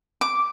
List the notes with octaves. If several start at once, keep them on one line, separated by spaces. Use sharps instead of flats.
D6